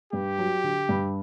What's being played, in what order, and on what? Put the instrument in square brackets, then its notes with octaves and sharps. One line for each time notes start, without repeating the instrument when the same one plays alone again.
[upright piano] G2 [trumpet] G4
[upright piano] F#3
D3
G2